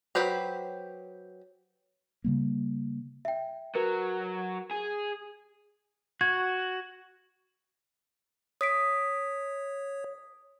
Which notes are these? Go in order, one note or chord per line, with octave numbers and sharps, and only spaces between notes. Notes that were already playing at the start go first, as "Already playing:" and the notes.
F#3 G4 B4 C5 A#5
C#3 G3 A#3
E5 G5
F#3 A#4 B4
G#4
F#4 G#6
C#5 D#6 B6 D7